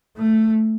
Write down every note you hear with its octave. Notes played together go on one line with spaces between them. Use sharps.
A3